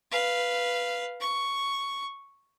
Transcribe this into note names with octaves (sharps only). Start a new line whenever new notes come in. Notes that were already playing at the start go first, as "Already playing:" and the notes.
B4 F5
C#6